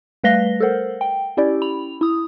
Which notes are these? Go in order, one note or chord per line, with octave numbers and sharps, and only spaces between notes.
G3 A3 B4 F5 A#6 G7
A4 A#4 C5 F#5
G5
C#4 E4 G4 D5
B5 F7
E4 D#6